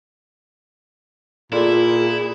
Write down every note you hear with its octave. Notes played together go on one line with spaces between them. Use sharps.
A#2 E4 F4 G#4 A4 D5